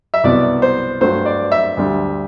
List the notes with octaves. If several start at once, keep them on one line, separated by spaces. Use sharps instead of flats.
E5
C2 B2 F#3 B3 D5
C5
G2 F#3 A3 C5
D5
E5
D2 D3 G3